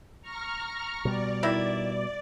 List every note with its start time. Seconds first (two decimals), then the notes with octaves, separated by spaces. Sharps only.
0.21 A#5 C#6 F6
1.05 B2 G3 D5
1.43 D#3 E4